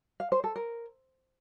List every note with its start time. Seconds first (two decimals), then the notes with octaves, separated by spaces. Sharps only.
0.20 F5
0.32 C5
0.44 A4
0.56 A#4